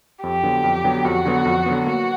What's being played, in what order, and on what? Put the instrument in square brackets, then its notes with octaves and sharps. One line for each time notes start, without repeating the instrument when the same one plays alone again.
[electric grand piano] F2 [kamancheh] G4
[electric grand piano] D3 F#3 B3
F2
D3 F#3 B3
[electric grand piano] F2 [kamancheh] F#4
[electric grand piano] D3 F#3 B3
F2
D3 F#3 B3
[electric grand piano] A#3 [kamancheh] F#4